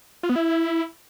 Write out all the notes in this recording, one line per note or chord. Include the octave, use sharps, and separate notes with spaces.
F4
B3
E4